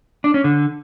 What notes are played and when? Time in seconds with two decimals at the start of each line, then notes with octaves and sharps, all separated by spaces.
0.24 D4
0.34 C#4
0.44 D3